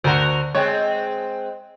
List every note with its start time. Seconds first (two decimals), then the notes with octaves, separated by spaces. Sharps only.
0.04 D2 F#4 A#4 C5
0.55 G#3 C4 C#5